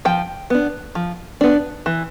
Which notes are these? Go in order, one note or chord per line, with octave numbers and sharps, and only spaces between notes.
F3 G5
B3 D4
F3
B3 D4
E3